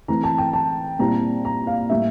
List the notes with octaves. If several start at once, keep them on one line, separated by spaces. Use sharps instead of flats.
E3 A3 C4 A#5
A5
G5
A5
A#2 G3 C4 E4 A#5
A#5
F5
A2 G3 A#3 E5